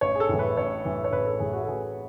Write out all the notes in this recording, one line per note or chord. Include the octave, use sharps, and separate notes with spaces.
A1 C#5
G#4
A4
A2 E3
B4
A1 C#5
A2 E3
C#5
A1 B4
A4
A2 E3 G#4
F#4
A4
A1 G#4